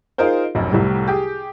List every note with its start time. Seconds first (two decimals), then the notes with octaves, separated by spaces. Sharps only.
0.18 D#4 F4 G#4 A#4 C5
0.55 F1 B1 F#2
0.72 C2 A2 C3 G3
1.08 G4 G#4